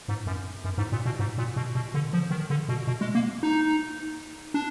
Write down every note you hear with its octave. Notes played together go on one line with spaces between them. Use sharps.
G#2
F#2
F#2
G#2
A#2
B2
G#2
A#2
B2
B2
D3
F3
D#3
D3
B2
B2
G#3
A#3
D#4
D4